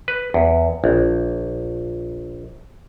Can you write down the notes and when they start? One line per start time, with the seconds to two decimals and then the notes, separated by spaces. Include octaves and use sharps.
0.08 B4
0.34 E2
0.84 A#1